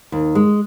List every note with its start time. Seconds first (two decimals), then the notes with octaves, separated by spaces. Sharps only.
0.12 D#2
0.35 G#3